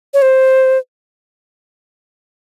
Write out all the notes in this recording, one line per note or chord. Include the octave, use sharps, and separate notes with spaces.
C#5
C5